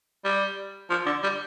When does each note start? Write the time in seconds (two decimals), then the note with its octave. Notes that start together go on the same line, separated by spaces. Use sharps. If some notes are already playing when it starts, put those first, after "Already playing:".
0.25 G3
0.90 F3
1.06 D3
1.23 G3